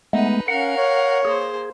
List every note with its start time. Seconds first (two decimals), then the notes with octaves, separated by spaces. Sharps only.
0.13 G#3 A3 B3 D#4 B4
0.48 C#4 A#4 F5 F#5
0.77 C#5
1.25 A#3 G#4 C5